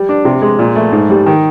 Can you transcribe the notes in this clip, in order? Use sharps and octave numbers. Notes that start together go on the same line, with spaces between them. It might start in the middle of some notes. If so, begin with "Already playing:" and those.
Already playing: G3
D4
C3
G#3
A#2
A3
G#2
G3
D#3